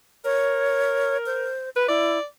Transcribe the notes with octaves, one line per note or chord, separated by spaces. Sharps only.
A#4 C#5
C5
B4 B5
E4 D5